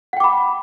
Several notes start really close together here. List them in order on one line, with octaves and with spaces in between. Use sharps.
F#5 G5 D6 B5